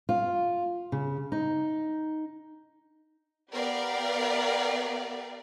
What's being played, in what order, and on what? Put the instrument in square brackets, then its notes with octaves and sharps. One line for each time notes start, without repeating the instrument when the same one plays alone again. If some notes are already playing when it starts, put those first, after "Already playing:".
[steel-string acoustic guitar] F4
C#3
D#4
[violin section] B3 G4 A#4 D5 F5